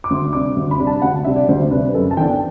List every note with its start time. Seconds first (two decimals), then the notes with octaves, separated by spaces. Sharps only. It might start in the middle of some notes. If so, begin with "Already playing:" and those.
0.04 D6
0.10 D2 C6
0.33 C3 G3 D4 D6
0.56 D2
0.71 B5
0.78 C3 G3 D4
0.87 A5
1.02 D2 F#5
1.25 C3 G3 D4 E5
1.36 D5
1.49 D2 C5
1.71 C3 G3 D4 B4
1.94 F#2 A4
2.11 A5
2.17 E3 B3 D4 G5